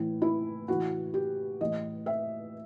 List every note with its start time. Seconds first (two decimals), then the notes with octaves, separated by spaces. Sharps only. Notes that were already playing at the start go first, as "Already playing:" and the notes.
Already playing: A2 E3
0.22 E4
0.68 A2 E3 F#4
1.14 G4
1.61 A2 E3 D#5
2.06 E5